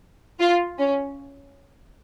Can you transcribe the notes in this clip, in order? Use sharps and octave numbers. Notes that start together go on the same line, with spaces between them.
F4
C#4